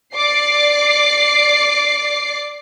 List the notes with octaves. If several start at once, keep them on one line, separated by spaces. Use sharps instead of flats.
D5 D6 C7